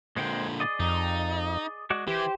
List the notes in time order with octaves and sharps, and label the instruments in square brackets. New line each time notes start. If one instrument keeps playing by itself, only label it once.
[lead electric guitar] A#2 D3 [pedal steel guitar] G#3 C5 G5
[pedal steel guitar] G#4 D5 D#5
[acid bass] F2 [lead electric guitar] D#4
[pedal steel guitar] G#3 F#4 D5
[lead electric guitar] E3 [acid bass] G4 [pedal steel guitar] C5